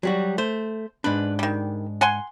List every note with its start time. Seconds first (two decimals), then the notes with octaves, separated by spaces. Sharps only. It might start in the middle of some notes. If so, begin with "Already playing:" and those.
0.03 F#3 G3 F#4
0.38 A3 C5
1.04 G#2 D4 B4
1.39 D#3 G3
2.01 F#5 G#5 C6